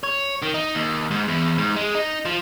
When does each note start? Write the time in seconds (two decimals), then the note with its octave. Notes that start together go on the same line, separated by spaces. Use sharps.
0.03 C#5
0.42 D#3
0.54 D#4
0.75 D#2
1.11 G#2
1.28 E2
1.58 G#2
1.76 G#3
1.95 D#4
2.25 F3